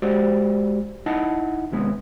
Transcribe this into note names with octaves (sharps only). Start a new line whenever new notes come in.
G#3 F#4 G4 C5 D5
D#4 E4 D#5 F#5 A5
D#2 C3 G#3 B3